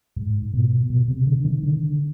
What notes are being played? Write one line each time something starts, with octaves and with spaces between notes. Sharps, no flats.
G#2
B2
B2
C3
D3
D#3
D3